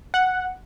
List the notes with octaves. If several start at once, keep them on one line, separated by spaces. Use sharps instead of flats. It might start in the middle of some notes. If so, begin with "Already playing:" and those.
F#5